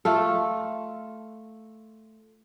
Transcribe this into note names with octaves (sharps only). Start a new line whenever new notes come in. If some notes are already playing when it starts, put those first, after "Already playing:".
A3 F4 A4